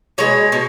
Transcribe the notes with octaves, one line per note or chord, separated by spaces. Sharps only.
B2 G#3 C#5
B2